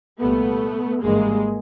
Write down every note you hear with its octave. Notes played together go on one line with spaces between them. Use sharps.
C2 A#2 G3 A3 B3
G#1 G2 E3 G3 G#3 A#3